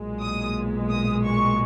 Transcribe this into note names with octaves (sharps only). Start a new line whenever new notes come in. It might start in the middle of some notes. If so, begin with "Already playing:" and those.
Already playing: B1 A#2 G#3
D#6
D#6
C#6